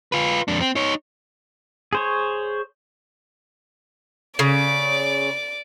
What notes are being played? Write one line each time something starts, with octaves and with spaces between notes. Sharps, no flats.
F4 B4
F2 D4
C4
D#4 C#5
G#4 C5 C#5
C#3 D5 D6